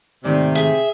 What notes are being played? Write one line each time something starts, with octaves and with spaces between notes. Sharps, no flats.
G#2 C3 D#3 A3 D5
G#4 E5